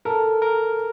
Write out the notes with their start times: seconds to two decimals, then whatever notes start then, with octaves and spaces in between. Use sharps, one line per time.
0.05 A4 A#4
0.42 A#4